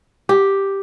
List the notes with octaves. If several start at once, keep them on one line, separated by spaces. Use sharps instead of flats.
G4